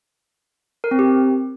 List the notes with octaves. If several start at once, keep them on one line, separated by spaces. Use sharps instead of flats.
A#4
C4
G4